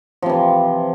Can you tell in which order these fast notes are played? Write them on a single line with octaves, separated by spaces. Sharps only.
F3 C3 E3